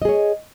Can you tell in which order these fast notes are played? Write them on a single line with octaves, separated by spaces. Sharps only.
D#5 G#4 C#5